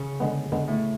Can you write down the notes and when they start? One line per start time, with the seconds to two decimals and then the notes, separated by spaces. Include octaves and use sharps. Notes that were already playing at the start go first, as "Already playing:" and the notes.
Already playing: C#3
0.20 D3 G#3 B3
0.52 D3 G#3 B3
0.68 A2